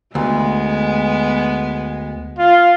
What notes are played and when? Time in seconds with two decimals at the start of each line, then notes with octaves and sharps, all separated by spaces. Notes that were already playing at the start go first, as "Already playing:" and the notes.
0.15 D2 G#3 B3
2.38 F4